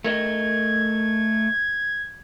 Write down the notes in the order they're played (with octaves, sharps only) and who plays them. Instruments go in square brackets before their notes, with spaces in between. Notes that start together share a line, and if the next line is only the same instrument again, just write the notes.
[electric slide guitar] A3 A#4 D#5 [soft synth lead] G#6